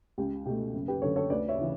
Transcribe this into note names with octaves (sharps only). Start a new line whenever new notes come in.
C#2 G4
B2 A3 G4
F#1
G4 B4
F#2 D3 A4 C#5
A4 C#5
D2 B4 D5
C#5 E5
C#3 E3